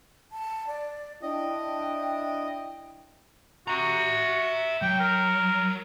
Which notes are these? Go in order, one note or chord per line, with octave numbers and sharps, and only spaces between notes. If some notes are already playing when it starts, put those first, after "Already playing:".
A5
D5
D4 E4 D#5 G5
F#4 E5 A#5
F#3 G5
A#4